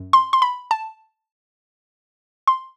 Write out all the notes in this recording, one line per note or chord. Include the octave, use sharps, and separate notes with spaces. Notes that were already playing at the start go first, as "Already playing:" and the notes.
Already playing: F#2
C6
C6
B5
A5
C6